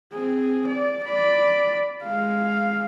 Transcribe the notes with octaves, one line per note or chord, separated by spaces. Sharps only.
C4 G#4
D5
D5 B5
G#3 F5